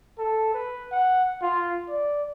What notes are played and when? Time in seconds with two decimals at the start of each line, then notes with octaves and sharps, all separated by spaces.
0.19 A4
0.54 B4
0.92 F#5
1.42 F4
1.88 D5